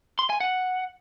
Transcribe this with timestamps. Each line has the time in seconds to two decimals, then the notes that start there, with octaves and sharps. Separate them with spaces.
0.19 C6
0.30 G#5
0.40 F#5